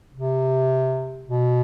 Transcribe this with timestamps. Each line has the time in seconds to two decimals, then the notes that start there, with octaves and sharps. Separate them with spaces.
0.14 C3
1.28 B2